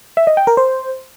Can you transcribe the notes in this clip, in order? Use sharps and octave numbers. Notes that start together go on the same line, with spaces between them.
E5
D#5
G5
A#4
C5